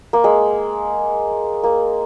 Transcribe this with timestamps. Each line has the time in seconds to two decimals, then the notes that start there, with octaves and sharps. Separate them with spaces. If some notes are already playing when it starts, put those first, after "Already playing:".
0.13 A#3
0.24 G#3
1.63 A#3